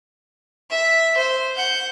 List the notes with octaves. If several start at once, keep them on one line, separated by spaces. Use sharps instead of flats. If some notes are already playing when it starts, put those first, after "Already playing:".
E5
C5
F#5 G6